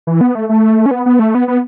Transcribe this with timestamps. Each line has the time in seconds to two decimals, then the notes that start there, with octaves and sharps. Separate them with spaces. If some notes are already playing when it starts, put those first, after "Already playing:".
0.07 E3
0.21 B3
0.35 A3
0.49 A3
0.86 C#4
0.91 B3
1.06 B3
1.19 A3
1.35 B3
1.48 B3